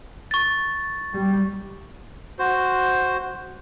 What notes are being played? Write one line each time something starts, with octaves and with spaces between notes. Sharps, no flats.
C#6 A6
G3
F#4 C5